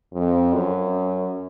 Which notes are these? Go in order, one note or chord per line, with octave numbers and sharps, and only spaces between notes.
F2
F#2